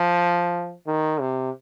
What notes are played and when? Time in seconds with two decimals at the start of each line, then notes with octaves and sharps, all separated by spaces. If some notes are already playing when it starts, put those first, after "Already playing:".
Already playing: F3
0.87 D#3
1.20 C3